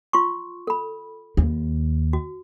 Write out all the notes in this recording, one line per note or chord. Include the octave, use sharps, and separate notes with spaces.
F4 C6 C#6
A4 B5
D#2
F#4